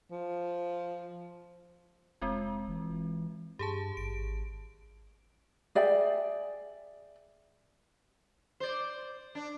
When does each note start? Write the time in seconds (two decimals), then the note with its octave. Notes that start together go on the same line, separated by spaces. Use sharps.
0.12 F3
2.21 F1 G#3 C4 F4
2.69 E3
3.59 G2 G4 G#4 A5
3.97 G#1 D7
5.75 G#4 D5 E5 G5
8.60 C5 D5
9.35 D4